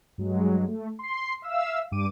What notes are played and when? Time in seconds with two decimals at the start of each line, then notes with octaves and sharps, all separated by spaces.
0.18 G2 F#3 G#3
0.68 A3
0.99 C6 C7
1.42 E5 F5 E6
1.91 G2 G4 D6 D#7